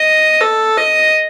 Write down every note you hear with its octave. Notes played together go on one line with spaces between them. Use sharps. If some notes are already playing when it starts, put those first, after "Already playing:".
Already playing: D#5
A4
D#5